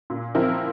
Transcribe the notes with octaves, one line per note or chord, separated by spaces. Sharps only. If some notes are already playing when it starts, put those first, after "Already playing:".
A#2
F3 C4 E4 A#4